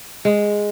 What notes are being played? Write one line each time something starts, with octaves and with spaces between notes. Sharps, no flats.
G#3